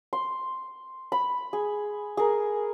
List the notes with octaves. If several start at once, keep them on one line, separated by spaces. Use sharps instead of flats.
C6
B5
G#4
G#4 A#4